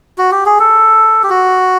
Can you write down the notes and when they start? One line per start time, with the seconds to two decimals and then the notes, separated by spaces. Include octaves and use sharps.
0.18 F#4
0.32 G4
0.46 G#4
0.59 A4
1.23 G4
1.30 F#4